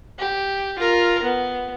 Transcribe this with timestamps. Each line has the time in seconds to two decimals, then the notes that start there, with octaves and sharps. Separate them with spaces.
0.19 G4
0.79 F4 A#4
1.23 B3